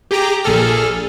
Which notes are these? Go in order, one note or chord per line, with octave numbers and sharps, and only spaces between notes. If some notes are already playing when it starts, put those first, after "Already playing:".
G4 G#4 G5 A#5 D6
A#1 A#2 G#4 A4 F6